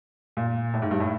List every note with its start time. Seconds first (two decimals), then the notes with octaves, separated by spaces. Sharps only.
0.37 A#2
0.74 A2
0.82 G#2
0.91 G2
1.00 A2